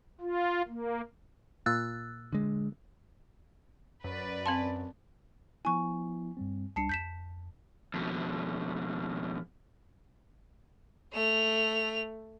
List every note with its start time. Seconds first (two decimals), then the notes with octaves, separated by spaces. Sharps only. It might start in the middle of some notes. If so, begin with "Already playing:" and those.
0.21 F4
0.67 A#3
1.66 A#2 F4 E6 F#6 A6
2.33 D3 G#3
4.04 F#2 B4 D5
4.46 C4 F5 A5 C6
5.65 F3 B3 E4 G#5 C#6
6.37 G2 G3 C4
6.76 C#2 G3 D4 A5 C7 C#7
6.89 F2 G6 B6 E7
7.94 F2 B2
11.13 A3 F7